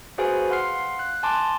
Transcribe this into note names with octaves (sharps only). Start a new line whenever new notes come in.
F#4 G#4 B4 C5 F5 G#5
F5 F#5 C6 F6 C7
F#6
G#5 A5 C6 D6